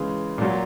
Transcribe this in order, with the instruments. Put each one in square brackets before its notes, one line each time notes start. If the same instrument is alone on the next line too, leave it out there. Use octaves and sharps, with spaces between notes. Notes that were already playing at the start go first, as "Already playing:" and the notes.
Already playing: [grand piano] C#3 E3 G#3
A#2 F#3